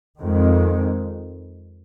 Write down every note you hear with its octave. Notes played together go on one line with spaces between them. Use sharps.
F2 D#3 G#3